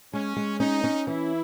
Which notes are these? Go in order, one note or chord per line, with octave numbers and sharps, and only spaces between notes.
G#3 C#4
G#3
C#4 D#4
C#4
E3 E4